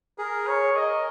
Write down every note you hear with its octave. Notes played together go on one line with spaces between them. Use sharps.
G#4 A#4
C#5
A#4 D#5